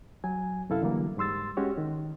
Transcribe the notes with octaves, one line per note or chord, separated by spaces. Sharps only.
F#3 G#5
F#2 C3 E4 A4 F5
D3 E3 F#3 G3 A#3
G#2 G3 C6 E6 A6
G#3 C#4 F#4 G4 C#5
D#3